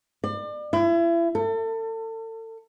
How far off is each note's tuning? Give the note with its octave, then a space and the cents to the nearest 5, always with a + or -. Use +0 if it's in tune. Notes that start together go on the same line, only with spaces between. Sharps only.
D5 +35
E4 +35
A4 +35